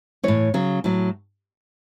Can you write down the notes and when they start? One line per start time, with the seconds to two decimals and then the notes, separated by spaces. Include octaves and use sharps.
0.23 A2 E3 C#5
0.54 C#3 F#3
0.84 A2 F#3